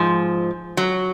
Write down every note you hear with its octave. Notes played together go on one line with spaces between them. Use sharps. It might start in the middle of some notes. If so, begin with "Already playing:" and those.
Already playing: G#2 F3
F#3